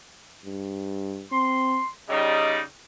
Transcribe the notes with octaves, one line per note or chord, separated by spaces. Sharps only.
G2
C4 C6
C#3 G3 D#4 D#5